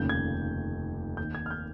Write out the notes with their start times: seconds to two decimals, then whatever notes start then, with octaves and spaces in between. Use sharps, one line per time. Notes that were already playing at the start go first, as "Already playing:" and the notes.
Already playing: F1 D#2 C#3 G6
0.09 G#6
1.17 D#2 D#3 G6
1.35 G#6
1.46 F6
1.51 G6